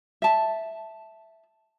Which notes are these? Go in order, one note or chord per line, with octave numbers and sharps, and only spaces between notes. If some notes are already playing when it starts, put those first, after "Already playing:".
E5 A5